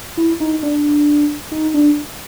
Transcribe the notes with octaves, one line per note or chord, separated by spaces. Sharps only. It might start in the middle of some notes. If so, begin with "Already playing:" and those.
E4
D#4
D4
D#4
D4